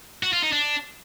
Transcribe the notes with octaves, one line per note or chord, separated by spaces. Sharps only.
F#4
F4
D#4
D4